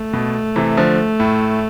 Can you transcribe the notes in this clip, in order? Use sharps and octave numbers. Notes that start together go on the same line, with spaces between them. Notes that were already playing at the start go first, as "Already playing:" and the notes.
Already playing: A3
B2
C3 E3
D3 F3
A2